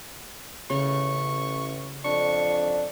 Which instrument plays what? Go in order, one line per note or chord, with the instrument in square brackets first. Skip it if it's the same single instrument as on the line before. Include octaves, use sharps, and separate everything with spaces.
[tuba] A1 [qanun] C#3 [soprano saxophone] C#6
[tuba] F2 [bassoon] D4 [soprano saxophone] C#6